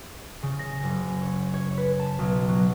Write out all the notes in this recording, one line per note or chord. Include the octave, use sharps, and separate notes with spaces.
C#3
A#6
F#1
C#5
C#5
B4
A5
B1
F#3